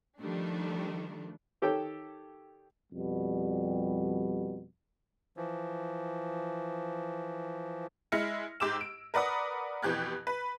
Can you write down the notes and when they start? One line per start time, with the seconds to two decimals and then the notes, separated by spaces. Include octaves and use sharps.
0.20 D#3 F3 G3 A3 D4
1.62 D#3 G4 A4 C#5 G5
2.91 F2 B2 G3
5.37 E3 F3
8.12 G#3 E4 F6 A#6 C#7
8.60 G#2 G4 D6 E6 E7
8.81 D7
9.14 A#4 B4 D5 F#5 D#6
9.83 F2 B2 E3 G4 F#6 G#6
10.27 B4